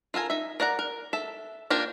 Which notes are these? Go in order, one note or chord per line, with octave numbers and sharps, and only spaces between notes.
F4 A4 A#4 G#5
D#4 E5
A#4 D5 F#5 A#5
A#4
A4 E5
A#3 D4 F4 G4 A#4